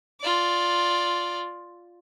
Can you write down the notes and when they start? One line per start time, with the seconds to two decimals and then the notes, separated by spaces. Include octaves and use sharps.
0.21 F4 D5